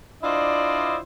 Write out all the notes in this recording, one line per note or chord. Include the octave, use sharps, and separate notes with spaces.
D4 E4 F4 C5 D5 D#5